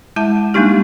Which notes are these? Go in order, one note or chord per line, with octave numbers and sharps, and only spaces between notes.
G#3 E4 E5 A5
G3 G#3 A#3 D4 D#4 G4